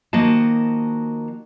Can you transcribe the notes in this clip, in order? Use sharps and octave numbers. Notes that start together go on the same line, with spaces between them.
D#3 F3 A#3 F#4 D#5 A5